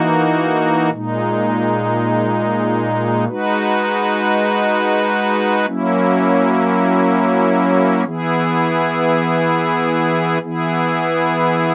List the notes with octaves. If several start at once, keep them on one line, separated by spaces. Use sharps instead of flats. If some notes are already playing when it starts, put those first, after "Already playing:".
Already playing: E3 A#3 D#4 F#4
A#2 G#3 D#4
G#3 D#4 F#4 B4
F#3 A#3 C#4 E4
E3 B3 E4 G#4
E3 B3 E4 G#4